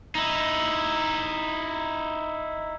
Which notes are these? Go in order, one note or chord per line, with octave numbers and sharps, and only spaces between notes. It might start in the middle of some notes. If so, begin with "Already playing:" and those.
D#4 E4